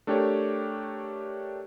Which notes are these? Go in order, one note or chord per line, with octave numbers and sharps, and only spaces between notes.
A3 D4 G4 A#4 C#5